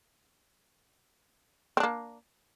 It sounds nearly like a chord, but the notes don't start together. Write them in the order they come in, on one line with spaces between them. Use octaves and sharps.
C4 D4 A#3